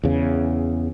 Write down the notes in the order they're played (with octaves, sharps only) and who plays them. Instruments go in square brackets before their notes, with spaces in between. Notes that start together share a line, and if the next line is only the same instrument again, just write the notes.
[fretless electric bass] E2 C#3